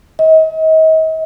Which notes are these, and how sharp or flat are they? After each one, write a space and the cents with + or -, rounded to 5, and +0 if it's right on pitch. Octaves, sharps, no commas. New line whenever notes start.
D#5 +40